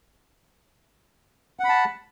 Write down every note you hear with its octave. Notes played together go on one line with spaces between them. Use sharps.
F#5 A5 B5